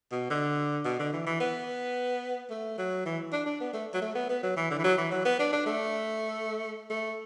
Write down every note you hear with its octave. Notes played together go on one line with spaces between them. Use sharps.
B2
D3
B2
D3
E3
E3
B3
A3
F#3
E3
D4
D4
B3
A3
F#3
A3
B3
B3
F#3
E3
D3
E3
F#3
E3
F#3
B3
D4
D4
A3
A3